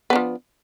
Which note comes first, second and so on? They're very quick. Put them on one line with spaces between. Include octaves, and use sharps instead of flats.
B3 D4 F3